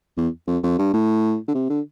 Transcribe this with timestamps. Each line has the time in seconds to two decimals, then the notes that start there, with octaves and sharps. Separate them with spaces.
0.17 E2
0.47 F2
0.63 F2
0.78 G2
0.93 A2
1.48 D3
1.54 C3
1.70 D3